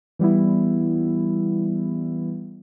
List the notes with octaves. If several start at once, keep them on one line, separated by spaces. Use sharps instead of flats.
E3 G3 B3 E4